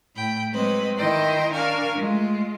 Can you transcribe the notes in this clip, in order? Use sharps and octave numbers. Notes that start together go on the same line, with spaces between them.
A2 G5 B5
F#3 G#3 C4 B4 D#5
D#3 E4 D#5 G5 A#5 C6
D4 A#4 F5 G#5 C#6
G#3 A3 F4